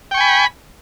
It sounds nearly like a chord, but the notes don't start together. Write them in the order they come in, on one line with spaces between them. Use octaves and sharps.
G5 C#6 G#5 B5